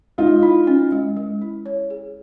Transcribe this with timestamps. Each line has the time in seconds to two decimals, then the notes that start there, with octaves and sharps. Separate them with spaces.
0.18 G#3 D#4 F4
0.43 E4
0.67 C#4
0.92 G#3
1.16 G#3
1.42 E4
1.66 C#5
1.90 G#4